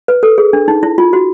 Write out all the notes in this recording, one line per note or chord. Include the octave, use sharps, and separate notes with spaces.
B4
A4
G#4
D4
D#4
E4
F4
F#4